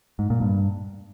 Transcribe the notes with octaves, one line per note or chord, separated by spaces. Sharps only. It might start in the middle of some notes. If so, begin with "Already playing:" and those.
G#2
A#2
G2